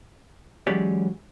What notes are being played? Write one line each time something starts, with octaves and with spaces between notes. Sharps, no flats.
E3 F#3 G#3 C#4 G4 D5